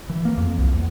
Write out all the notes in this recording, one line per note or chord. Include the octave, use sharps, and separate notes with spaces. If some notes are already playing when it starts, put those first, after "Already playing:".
E3
A#3
F2
C2
E2